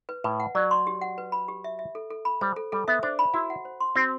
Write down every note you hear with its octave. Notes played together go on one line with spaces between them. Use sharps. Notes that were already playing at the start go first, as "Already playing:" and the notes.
B4
A2 B4
F#5
F#3 D5
C6
G4
F#5
B4
B5
G4
E5
E5
A4
A4
B5
G3 C5
A4
G3 A4
B3 E5
D4 C5
B5
E4 F#4
F#5
C5
C6
C4 F#4